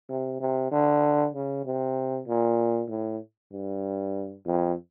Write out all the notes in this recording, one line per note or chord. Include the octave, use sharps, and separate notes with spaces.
C3
C3
D3
C#3
C3
A#2
A2
G2
F2